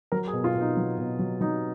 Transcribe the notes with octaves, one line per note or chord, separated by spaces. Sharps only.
F#3 A#4
G#4
B2
F4
B2
D#4
F#3
B2
F#3
F#3 D#4